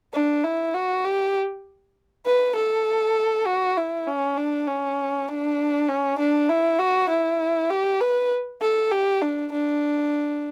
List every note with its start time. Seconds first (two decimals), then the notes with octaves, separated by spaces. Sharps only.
0.14 D4
0.43 E4
0.74 F#4
1.05 G4
2.26 B4
2.56 A4
3.46 F#4
3.77 E4
4.07 C#4
4.37 D4
4.67 C#4
5.28 D4
5.89 C#4
6.19 D4
6.49 E4
6.79 F#4
7.10 E4
7.70 G4
8.01 B4
8.61 A4
8.91 G4
9.22 D4
9.52 D4